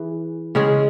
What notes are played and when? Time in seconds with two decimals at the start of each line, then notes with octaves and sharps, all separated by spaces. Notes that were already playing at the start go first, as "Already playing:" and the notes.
Already playing: E3 G#4
0.55 C#3 G#3 C#4 G#4